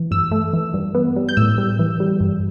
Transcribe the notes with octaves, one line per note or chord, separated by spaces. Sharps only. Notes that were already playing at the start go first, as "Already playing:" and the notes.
Already playing: E3
G2 E6
A3
E3
G2
B3
G3
G6
A2 E6
G3
E3
G3
G2